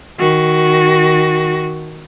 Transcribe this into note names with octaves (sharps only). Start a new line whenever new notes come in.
D#3 F#4